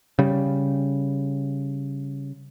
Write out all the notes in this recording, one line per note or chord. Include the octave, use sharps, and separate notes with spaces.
C#3 G3